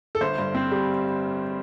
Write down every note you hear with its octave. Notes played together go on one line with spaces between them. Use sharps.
A4
G1 C5
G2
C4
G3